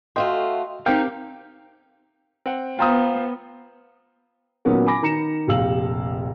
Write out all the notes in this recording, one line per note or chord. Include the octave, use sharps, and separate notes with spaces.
A3 F4 F#4 D#5 G5 C6
C4 D#4 G4 A#4 F5 G5
C4 F#5
B3 F4 C5 F5 G5 A#5 D#6
A#2 D#3 F#3 B3 C#4 A#4
G#5 B5 D6 A#6
D#3 A#5 C#7 E7
F1 A#1 G4 F5 E6 F#7